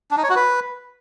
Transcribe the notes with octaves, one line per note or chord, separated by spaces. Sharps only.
D4
D#4
C#5
F#4
B4